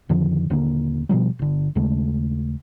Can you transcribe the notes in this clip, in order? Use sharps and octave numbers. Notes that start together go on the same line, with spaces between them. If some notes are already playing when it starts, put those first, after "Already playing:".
F2 D3 D#3 F3
D#1 D3 A#3
B2 D3 F3 G3
G1 D3
D#2 C#3 G#3 A3